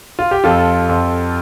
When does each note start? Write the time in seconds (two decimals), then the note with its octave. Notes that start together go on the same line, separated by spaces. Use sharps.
0.19 F4
0.31 G4
0.44 F2 F4 A4
0.89 F2